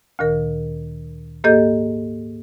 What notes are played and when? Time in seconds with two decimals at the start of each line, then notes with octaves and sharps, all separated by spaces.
0.19 D2 A#2 D#3 A#4
1.44 G#2 A#3 G4 A4 D#5 G6